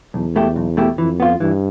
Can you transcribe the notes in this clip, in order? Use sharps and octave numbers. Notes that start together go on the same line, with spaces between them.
B1 E2
B2 A3 E4 G4
B1
B2 A3 E4 G4
F2 E3
B3 F4
G2 E3